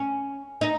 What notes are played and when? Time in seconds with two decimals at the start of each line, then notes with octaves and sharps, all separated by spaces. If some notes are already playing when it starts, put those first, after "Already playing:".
Already playing: C#4
0.61 D#4